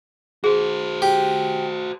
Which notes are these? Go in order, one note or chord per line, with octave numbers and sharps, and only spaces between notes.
F#4 G#4 C5
G4